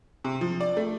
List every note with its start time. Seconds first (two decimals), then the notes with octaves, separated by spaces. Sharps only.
0.24 C3
0.41 F3
0.60 D5
0.77 A3